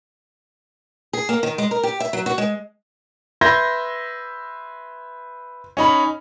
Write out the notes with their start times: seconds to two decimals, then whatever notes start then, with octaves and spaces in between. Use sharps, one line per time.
1.13 G#4
1.29 A#3
1.43 D#3
1.58 G#3
1.71 A#4
1.83 G4
2.00 E5
2.13 F#3
2.26 F#4
2.38 G#3
3.41 B4 E5 C6 G6 G#6 A#6
5.77 C#4 D#4 B5